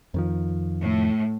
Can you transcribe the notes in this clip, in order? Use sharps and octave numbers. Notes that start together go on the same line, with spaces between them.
F2 D#3 F3
A2